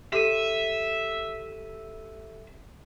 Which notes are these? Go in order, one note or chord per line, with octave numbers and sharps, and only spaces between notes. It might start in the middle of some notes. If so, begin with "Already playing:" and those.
G4 A4 E5 D#7